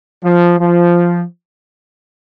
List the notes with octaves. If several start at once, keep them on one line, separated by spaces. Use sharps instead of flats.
F3
F3